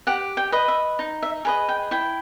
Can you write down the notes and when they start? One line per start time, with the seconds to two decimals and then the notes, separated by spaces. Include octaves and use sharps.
0.07 G4 F#5
0.37 G5
0.52 B4 D#5
0.68 E5
0.99 D#4
1.23 E5
1.45 G#4 B4 D#5 F5
1.69 G5
1.91 E4 G5